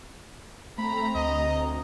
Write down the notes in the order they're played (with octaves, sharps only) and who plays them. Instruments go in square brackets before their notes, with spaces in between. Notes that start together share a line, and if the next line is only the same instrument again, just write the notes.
[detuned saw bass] A3 [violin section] C4 A#5 [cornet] B5
[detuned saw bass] D2 [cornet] D#5